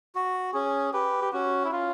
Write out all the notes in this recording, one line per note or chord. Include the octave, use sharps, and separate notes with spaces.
F#4
C#4 G#4
G4 B4
G4
C#4 F#4
E4
C#4 F4